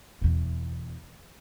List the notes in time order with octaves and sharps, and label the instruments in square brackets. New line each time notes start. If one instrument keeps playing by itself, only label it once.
[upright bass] E2 B2